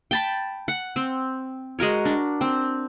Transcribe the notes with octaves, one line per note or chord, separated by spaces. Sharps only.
G5 A5 B5
F#5
C4
G#3 F#4 A#4 C#5
D4
C4